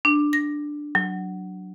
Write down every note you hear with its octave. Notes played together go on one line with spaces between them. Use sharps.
D4
A#6
F#3